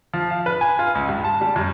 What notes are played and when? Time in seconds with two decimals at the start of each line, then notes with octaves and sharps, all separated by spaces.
0.13 F3
0.31 F5
0.46 B4
0.61 G#5
0.79 F4
0.95 C#2
1.09 G2
1.24 A5
1.41 G3
1.56 F#2